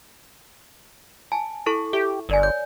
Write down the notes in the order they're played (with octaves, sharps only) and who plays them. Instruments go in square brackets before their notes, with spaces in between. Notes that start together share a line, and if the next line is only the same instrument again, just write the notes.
[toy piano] G#5 [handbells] A5
[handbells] E4 A4 C#6
[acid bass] G4 [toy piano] E5
[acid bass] G1 [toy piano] A#4 D5 G#5
[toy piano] C#5 [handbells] G6